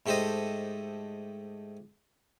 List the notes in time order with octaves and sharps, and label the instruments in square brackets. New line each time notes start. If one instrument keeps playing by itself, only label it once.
[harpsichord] G#2 A3 G4 A4 C5 D#5